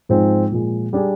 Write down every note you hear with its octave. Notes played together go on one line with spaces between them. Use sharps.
G#2 F3 G#3 C4 D#4
A#2 F3 G#3
G3 D4 G#4